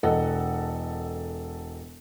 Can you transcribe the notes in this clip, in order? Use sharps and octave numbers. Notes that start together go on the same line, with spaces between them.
E1 A4 D#5 F#5